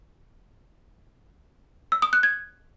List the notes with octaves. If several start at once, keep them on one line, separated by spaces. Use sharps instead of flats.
E6
D#6
F#6
G#6